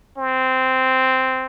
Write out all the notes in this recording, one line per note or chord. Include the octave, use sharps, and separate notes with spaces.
C4